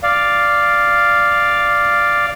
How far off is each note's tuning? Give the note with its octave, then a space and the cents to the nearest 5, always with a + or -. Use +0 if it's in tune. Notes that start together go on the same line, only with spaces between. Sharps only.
D5 +0 F5 +0